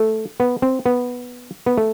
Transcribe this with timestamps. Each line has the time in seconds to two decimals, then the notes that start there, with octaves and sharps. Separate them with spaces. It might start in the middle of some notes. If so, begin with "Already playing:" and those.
Already playing: A3
0.40 B3
0.62 C4
0.86 B3
1.66 B3
1.77 A3